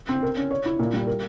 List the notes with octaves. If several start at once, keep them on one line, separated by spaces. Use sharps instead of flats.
C4
A#4
C#4
C#5
E4
A#2
G3
A#4